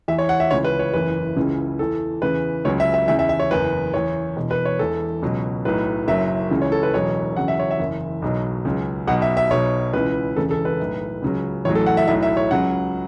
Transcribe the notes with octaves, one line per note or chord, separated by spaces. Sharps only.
E2 E3 E5
C#5
F#5
E5
C#2 C#3 E3 C#5
B4
C#5
F#1 E2 E3 B4
C#2 C#3 E3
E2 E3 A4
E2 C#3 E3 B4
C#2 C#3 F#3 C#5
E5
E5
E2 C#3 E3 E5
E5
E5
C#5
F#1 E2 E3 B4
E2 E3 C#5
E1 E2 B2
B4
C#5
E1 E2 E3 A4
C#2 B2 F#3
B1 A2 F#3 B4
F#1 F#2 F#3 E5
C#2 C#3 E3
C#5
A4
B4
E1 E2 B2 F#3 C#5
E2 C#3 F#3 F#5
E5
C#5
E5
F#1 E2 E3
B1 B2 F#3
C#2 C#3 F#3
B1 B2 F#3 F#5
E5
E5
B1 B2 F#3 C#5
C#2 C#3 E3 B4
E1 E2 C#3 A4
A4
B4
B1 A2 E3
C#2 C#3 F#3
A1 A2 F#3 C#5
A4
F#5
E5
B1 A2 F#3 E5
E5
C#5
C#2 C#3 F#3 F#5